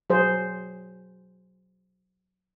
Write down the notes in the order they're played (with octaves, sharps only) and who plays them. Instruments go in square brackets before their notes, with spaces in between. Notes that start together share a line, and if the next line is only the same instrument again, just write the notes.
[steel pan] F#3 G#4 C5